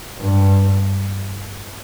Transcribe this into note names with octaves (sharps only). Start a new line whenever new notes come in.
G2